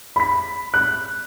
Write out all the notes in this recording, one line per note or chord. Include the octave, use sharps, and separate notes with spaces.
B5 B6
F#6